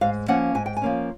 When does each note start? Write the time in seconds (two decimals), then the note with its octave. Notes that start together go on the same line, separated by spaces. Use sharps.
0.01 G#2 F5
0.28 F3 A#3 C#4 F#5
0.55 G#2 G#5
0.66 G5
0.77 G#5
0.82 F3 A#3 C#4